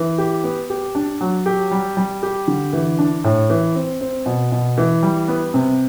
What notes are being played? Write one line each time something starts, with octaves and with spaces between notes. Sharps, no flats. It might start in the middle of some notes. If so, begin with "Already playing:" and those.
Already playing: E3
G4
B3
G4
D4
F#3
G4
G3
G3
G4
D3
E3
D4
A2
E3
C4
C4
B2
B2
E3
G3
B3
C3